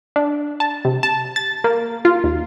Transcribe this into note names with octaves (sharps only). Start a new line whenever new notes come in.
D4
A5
C3
A5
A6
A#3
F4
D#2